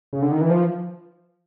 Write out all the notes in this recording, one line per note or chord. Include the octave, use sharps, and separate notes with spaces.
C#3
D3
D#3
E3
F3